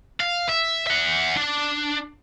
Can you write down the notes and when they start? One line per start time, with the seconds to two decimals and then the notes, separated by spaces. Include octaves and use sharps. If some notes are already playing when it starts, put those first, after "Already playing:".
0.20 F5
0.49 E5
0.87 E5 F#5
1.36 D4